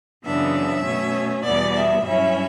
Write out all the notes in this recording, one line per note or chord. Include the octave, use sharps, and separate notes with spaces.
F#2 C#3 E3 B3 D4 E5
B2 A3 C#4
E2 B2 G3 B3 D5
E5
G2 F#3 C#4 E4 E5